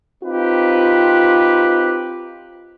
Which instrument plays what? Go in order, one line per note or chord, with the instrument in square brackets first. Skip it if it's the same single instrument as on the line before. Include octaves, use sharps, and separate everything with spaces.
[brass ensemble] C4 D#4 F4 G4 B4